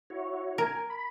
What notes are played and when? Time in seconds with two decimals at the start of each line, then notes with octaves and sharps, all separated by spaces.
0.10 E4 F#4 C#5
0.58 A#4 G#5
0.90 B5